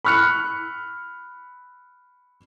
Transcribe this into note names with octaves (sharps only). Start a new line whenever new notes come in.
B5 C#6 F6 F#6 C#7